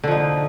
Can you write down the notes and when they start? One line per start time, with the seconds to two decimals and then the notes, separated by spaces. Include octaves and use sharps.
0.04 D3
0.07 F3
0.11 D#4